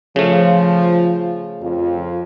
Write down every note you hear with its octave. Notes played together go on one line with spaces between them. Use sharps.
C#3 F3 A3
F2 F4